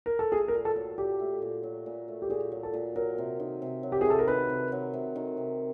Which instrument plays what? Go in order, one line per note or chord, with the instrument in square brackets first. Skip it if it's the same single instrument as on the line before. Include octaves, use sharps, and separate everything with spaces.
[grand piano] A#4
A4
[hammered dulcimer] A3 [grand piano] G#4
[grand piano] A#4
[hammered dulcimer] A#2
[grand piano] A4
[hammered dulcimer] F#3
[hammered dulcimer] A#2 [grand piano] G4
[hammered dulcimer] A3
A#2
F#3
A#2
A3
[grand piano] G4
[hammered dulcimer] A#2 [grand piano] G#4
[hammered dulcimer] F#3
[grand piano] A4
[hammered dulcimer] A#2
[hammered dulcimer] F#3 [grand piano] A#4
[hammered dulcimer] C3
D#3
C3
F#3
[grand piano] G4
G#4
[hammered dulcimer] C3 [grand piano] A4
[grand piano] A#4
[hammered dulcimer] D#3 [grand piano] B4
[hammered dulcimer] C3
F#3
C3
D#3
C3